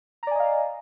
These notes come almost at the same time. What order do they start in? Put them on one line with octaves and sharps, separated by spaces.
A#5 D5 G#5 D#5 F5